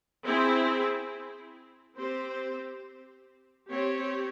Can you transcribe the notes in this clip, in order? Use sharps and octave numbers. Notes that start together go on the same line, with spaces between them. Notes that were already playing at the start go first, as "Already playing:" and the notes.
C4 E4 G#4
C4 G4 C5
C4 G4 C#5